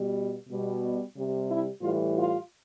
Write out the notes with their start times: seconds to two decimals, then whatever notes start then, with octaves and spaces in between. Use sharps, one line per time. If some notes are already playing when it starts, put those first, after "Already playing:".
Already playing: B2 G3
0.49 B2 G3
1.16 C3 G3
1.49 E4
1.82 A2 E3 G3 F4
2.16 F4